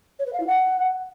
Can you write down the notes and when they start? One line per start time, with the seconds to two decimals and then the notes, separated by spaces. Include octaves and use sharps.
0.19 C#5
0.26 B4
0.33 F5
0.40 E4
0.47 F#5